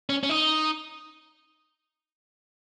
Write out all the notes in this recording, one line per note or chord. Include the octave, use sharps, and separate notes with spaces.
C#4
C#4
D#4